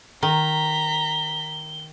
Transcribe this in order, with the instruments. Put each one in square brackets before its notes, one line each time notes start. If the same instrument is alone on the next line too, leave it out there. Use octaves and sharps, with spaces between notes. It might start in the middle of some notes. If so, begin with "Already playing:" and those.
[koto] D#3 [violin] A#5 B6 [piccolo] G7